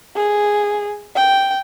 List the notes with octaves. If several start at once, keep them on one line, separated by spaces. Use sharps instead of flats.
G#4
G5